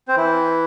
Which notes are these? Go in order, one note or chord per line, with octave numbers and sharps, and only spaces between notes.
C4 C5
E3 E4